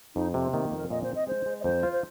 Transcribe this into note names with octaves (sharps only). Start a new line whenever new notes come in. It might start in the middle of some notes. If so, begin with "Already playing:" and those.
F2 D#4
C3 C4
D#3 A#3
A#3
F2
A#4
A#2 D#5
C5
C4
D#5
G#3 C5
G#3
D#5
F2 C5
F4
C5